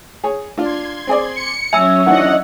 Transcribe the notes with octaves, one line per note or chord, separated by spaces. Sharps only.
G#4 C#5
D4 F4 C6 G#6
C4 G#4 D5
C#7
F#3 C#4 C#5 E5 G#5 E6
D#3 E3 D4 D#5 F#5